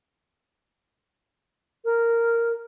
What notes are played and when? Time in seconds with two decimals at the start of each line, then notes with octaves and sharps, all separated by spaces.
1.85 A#4